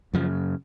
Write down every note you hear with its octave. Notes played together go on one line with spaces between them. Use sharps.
F#2 C#3 F3